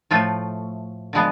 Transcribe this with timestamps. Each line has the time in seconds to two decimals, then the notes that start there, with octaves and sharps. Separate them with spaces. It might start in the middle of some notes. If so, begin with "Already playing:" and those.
0.11 A2 F3 A3 F4
1.13 D3 F3 G#3 B3